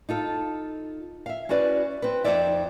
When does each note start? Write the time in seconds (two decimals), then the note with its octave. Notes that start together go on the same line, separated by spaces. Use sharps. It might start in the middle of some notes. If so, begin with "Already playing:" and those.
0.09 D#4 F4 A4
1.26 E5 F5
1.49 C#4 E4 F#4 B4 D5
2.02 C4 B4
2.24 F2 C3 D#4 C5 D5 E5